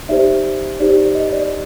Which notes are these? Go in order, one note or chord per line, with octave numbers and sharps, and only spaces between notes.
D#4 G4 C5 D5 E5
D#4 G4 C5 D5
D5
D#5
D5